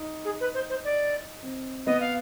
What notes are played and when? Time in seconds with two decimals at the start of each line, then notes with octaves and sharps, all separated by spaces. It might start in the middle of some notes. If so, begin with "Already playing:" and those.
Already playing: D#4
0.25 G#4
0.41 B4
0.54 C5
0.70 C5
0.84 D5
1.43 C4
1.86 B3 D#5
2.00 F5